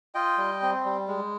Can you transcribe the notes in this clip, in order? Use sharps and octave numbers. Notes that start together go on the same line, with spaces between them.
F4 D#5 G5
G3
C4
G3
G#3